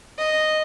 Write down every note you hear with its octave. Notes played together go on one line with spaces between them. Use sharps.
D#5